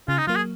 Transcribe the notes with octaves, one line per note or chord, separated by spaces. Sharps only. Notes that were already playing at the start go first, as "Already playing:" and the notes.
C#3 F4
D#4
F#3 A#3 F4
G#4